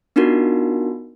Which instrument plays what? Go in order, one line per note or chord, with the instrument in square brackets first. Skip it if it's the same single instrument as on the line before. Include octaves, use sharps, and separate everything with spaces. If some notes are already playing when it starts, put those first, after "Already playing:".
[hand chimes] B3 D4 D#4 F4 F#4 A#4